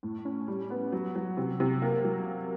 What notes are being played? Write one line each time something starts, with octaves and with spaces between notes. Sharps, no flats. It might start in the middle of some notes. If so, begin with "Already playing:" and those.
A2
C#4
G3
B3
F#3
F#3
C3
C3
A#3
F#3